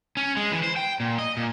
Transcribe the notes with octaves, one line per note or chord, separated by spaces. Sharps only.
C#4
G#3
E3
C5
G5
A#2
D#5
A#2